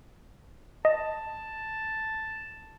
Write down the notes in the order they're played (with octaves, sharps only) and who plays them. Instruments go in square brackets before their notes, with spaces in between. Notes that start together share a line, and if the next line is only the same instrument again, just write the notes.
[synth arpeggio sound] D#5 [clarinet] A5